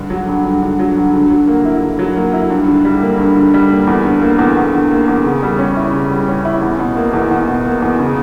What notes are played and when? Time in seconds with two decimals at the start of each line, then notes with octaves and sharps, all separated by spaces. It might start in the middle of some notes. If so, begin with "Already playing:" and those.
Already playing: G2 D3
0.10 F#3
0.28 G2
0.45 G2
0.62 D3
0.79 F#3
0.96 G2
1.14 D3
1.30 F#3
1.48 A#3
1.65 E4
1.82 D3
1.99 F#3
2.17 A#3
2.33 E4
2.50 G2
2.68 D3
2.85 G3
3.02 A#3
3.19 G2
3.36 D3
3.54 G3
3.70 A#3
3.87 E2
4.05 D3
4.22 A#3
4.39 E2
4.57 E2
4.74 D3
4.91 A#3
5.08 E2
5.25 C#3
5.42 G3
5.59 C#4
5.76 E4
5.93 C#3
6.11 G3
6.28 C#4
6.45 E4
6.62 E2
6.79 B2
6.97 A#3
7.13 E2
7.31 E2
7.48 B2
7.65 A#3
7.82 E2
7.99 C#3